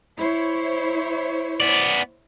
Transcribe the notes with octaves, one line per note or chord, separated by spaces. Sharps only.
E4 C5 C#5
B3 D5